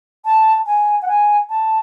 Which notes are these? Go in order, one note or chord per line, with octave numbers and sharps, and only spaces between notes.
A5
G#5
F#5
G#5
A5